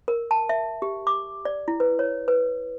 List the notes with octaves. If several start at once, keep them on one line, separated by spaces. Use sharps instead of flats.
A#4
A5
E5
G4
D6
D5
E4
B4
C#5
B4